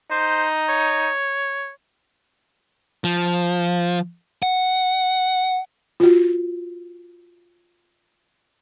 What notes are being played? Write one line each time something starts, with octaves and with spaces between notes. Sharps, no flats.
D#4 C5
C#5
F3
F#5
F4 F#4